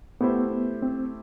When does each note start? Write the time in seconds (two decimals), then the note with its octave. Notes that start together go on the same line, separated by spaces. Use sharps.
0.21 A3 B3 E4 G4 C5
0.51 B3
0.82 C4